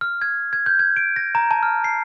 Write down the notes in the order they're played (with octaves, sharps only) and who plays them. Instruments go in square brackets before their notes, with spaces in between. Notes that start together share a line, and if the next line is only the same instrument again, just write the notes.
[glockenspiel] F6
G#6
G#6
G6
G#6
D7
A#6
A#5
A5
F6
C7